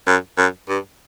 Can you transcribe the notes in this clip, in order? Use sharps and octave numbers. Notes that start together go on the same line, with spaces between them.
F#2
F#2
G2